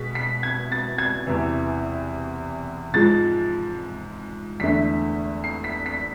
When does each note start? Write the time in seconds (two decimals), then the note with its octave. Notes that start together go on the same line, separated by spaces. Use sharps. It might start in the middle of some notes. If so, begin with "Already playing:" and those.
Already playing: B2 G#3 B6
0.15 B6
0.43 G#6
0.72 A6
0.98 G#6
1.27 E2 C3 E3
2.94 G#2 F3 G#3 A6
4.60 E2 D3 A3 B6
5.44 C7
5.64 B6
5.86 B6